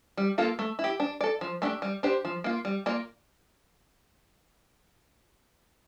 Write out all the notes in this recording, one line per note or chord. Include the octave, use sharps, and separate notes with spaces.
G3
A#3 F4 A4
A3
E4
G4
D4
A4 D5
F3
A3 D4 G4
G3
D4 G4 C5
F3
A#3 F4
G3
A#3 F4 A#4 D5